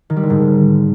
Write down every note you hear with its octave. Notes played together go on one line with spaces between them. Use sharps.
D#3
G3
D3
G#2